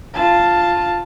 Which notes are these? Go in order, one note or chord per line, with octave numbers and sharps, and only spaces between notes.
F4 A5